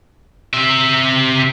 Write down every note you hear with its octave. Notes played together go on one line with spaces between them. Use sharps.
C4 E5